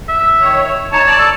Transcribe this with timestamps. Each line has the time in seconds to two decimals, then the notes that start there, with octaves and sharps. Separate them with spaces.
0.09 E5
0.41 D#3 C#5
0.92 D#4 C#5 A5
1.06 D5 A5
1.19 A4